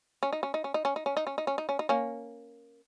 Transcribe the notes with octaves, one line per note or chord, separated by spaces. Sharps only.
C#4
D#4
C#4
D#4
C#4
D#4
C#4
D#4
C#4
D#4
C#4
D#4
C#4
D#4
C#4
D#4
A#3 C#4